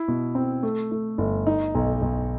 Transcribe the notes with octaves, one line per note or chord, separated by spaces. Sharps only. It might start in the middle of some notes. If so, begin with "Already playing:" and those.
Already playing: E4
B2
C4
A3
A3
G1
D#4
B1
B1